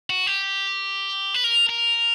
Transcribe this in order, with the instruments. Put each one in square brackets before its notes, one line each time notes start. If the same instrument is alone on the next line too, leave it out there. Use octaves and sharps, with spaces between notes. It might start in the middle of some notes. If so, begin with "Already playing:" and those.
[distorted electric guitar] F#4
G4
B4
A#4
A#4